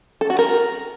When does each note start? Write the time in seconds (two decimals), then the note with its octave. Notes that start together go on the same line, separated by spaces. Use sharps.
0.21 A4
0.30 F#4
0.39 A#4